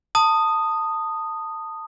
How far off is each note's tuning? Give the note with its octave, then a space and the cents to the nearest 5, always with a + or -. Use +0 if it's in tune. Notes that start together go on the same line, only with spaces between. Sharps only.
A5 +20 D#6 -5